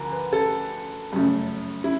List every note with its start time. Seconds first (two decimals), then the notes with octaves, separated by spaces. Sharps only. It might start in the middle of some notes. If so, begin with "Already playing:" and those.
Already playing: D2 D3 F3 A#4
0.12 B4
0.33 A4
1.12 G1 F#2 C#3 F#3 A3
1.84 E4